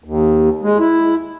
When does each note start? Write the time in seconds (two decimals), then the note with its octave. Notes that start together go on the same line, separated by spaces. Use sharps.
0.04 D#2
0.62 G#3
0.79 E4